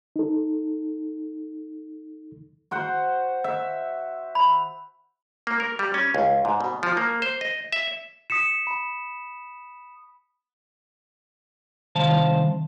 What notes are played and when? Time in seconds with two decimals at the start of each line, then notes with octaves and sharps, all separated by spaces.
0.16 D#4 A4
2.71 F#4 C5 F#5
3.44 E5
4.35 B5
5.47 A#3
5.60 A#4
5.79 G3
5.94 C#4
6.14 C#2
6.45 G#2
6.61 B2
6.83 F3
6.97 A#3
7.22 C5
7.41 D#5
7.72 E5
8.30 D#6 B6 C#7 E7
8.67 B5
11.96 C2 D#3 C5 F5 A5